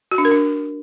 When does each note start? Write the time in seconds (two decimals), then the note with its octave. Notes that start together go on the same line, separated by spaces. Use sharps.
0.11 F#4
0.18 D4
0.25 A#4
0.32 D4